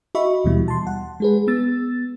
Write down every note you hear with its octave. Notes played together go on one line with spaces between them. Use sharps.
F#4 D#5 E5 B5 C#6
D#2 B2 E3 G3
A5 C6
F#5
G#3 G#4 B4
B3 E6 A6